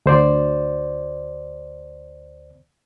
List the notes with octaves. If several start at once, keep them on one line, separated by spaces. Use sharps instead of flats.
D2 C5 D5